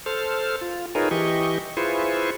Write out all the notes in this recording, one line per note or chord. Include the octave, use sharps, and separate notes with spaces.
A4 C5 F6
F4
D#4 F4 G#4 A#4 B4 C#5
E3 G4 D#5 C#6
E4 F4 G#4 B4 C5 C#6